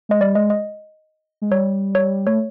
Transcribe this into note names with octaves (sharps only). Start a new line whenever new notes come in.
G#3 D#5
G3 D5
G#3 D#5
D#5
G#3
G3 C#5
C#5
A3 C#5